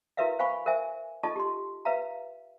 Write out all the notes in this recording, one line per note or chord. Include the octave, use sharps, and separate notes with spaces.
E4 F#4 A#4 B4 E5 F5
C5 F5 G#5 B5 C#6
A#4 C5 E5 G#5
D#4 F4 A4 D#5 A5 C#6
G4 C6
B4 E5 F5 A#5